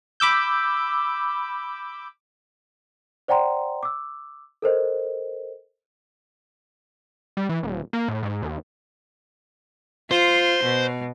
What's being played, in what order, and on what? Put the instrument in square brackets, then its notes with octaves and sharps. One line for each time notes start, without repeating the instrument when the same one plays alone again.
[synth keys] B5 D6 E6 G6
[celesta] C5 D5 F#5 G5 A#5 C6
D6 E6
A4 A#4 C5 D#5
[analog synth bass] G3
E3
D#1
A#3
A2
G#2
D#2
[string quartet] F4 [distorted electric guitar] C5
[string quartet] B2